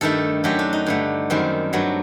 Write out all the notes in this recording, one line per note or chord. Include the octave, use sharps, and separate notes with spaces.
G2 D#3 A3 A4
F#2 F#3 A3 G4
D4
D#4
G2 D3 A3
F#2 D#3 G3 C4
G2 F#3 A3